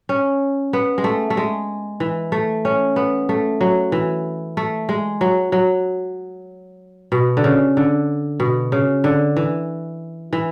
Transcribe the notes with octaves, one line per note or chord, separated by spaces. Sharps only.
C#4
B3
G#3
A3
A3
G#3
E3
A3
C#4
B3
A3
F#3
E3
A3
G#3
F#3
F#3
B2
D3
C#3
D3
B2
C#3
D3
E3
E3